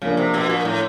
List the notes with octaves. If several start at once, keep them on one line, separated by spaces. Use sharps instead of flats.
C#3 F3 A#3 D4
C3
B2
A#2
A2